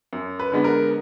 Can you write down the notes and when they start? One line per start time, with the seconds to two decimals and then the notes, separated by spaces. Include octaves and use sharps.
0.13 F#2
0.39 B4
0.52 D3 G#3 B3
0.64 A#4